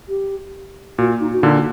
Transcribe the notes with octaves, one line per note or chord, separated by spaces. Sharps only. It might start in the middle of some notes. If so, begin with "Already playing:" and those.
G4
A#2 F#4
D#4
F#4
A#2 D3 D#4